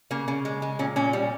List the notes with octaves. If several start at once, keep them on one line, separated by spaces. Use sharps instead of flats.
C#3 A#3
C#3
G#3
G#3
A#2 C#4
A#2 C#4
G3